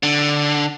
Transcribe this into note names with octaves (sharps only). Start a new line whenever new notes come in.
D3